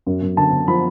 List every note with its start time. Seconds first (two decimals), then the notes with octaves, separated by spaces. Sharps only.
0.06 F#2
0.22 F#2
0.37 D3 A5
0.53 D3
0.68 F3 B5